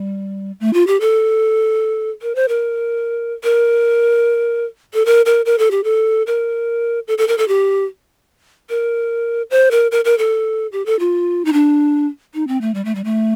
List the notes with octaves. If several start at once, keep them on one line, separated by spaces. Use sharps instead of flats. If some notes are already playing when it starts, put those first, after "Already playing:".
Already playing: G3
A3
F4
G4
A4
A#4
C5
A#4
A#4
A4
A#4
A#4
A#4
A4
G4
A4
A#4
A4
A4
A#4
A4
G4
A#4
C5
A#4
A#4
A#4
A4
G4
A4
F4
D#4
D4
D#4
C4
A3
G3
A3
G3
A3